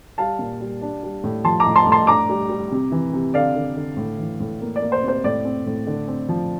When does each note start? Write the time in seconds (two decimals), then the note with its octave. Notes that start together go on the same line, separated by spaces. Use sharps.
0.18 G3 F5 A5
0.39 A#2
0.61 G3
0.82 D4
1.03 G3
1.24 A2
1.45 F3 A5 C6
1.60 A#5 D6
1.66 A2
1.76 A5 C6
1.87 A2
1.92 A5 C6
2.07 D4 A#5 D6
2.29 G3
2.50 G3
2.72 C3
2.92 E3
3.13 C3
3.34 D3 D5 F5
3.56 D3
3.77 D3
3.97 A2
4.18 E3
4.40 A2
4.61 A#3
4.76 D5
4.82 A#3
4.92 C5
5.03 C3
5.08 C5
5.24 A2 D5
5.45 C4
5.66 A2
5.87 D3
6.08 C4
6.29 F3